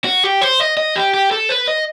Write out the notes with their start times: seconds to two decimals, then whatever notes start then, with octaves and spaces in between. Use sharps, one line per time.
0.05 F#4
0.24 G4
0.41 C5
0.60 D#5
0.77 D#5
0.96 G4
1.14 G4
1.31 A4
1.49 B4
1.68 D#5